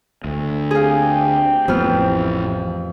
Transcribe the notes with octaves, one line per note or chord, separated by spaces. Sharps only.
D2
C4 G4 G#4 F5
A1 F2 B3 F6